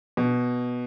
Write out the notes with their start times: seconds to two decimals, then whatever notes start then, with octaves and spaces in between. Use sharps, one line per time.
0.17 B2